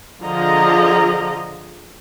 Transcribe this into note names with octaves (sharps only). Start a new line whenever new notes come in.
D3 F3 F4 G#4 D#5 A#5